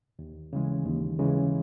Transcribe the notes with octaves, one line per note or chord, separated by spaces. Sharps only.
D#2
C#3 E3 G#3
D#2
C#3 E3 G#3